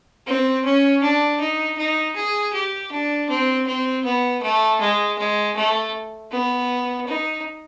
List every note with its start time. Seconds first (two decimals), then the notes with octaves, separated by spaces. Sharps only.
0.27 C4
0.65 C#4
1.03 D4
1.40 D#4
1.78 D#4
2.16 G#4
2.53 G4
2.92 D4
3.29 C4
3.67 C4
4.04 B3
4.42 A3
4.80 G#3
5.18 G#3
5.56 A3
6.31 B3
7.07 D#4